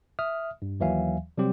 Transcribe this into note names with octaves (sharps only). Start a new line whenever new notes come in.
E5 D#6 F6
G2
D#2 E3 F#3 E5 F5 G#5
C3 F#3 G3 C4 G4